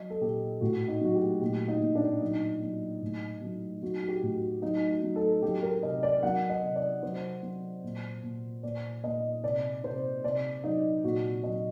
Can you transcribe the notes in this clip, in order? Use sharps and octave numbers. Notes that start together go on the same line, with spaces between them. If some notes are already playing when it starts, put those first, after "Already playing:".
Already playing: F#3 D#5
A4
A#2 G4
A2 F#4
D#4
F#3 F#4
G4
A#2 G4
D#4
A#2
D4
F#3 D#4
F#3
A2
F#3
F#3 F#4
F#4
G4
A2
F#4
F#3 D#4
F#4
F#3
A4
F#3 G4
A#4
C3 D#5
D5
F#3 F#5
D#5
C3
D5
F#3 C5
F#3
A#2
A#2
A#2 D5
A#2 D#5
C3 D5
C3 C5
C3 D5
F#3 D#4
A#2 F#4
F#3 D#5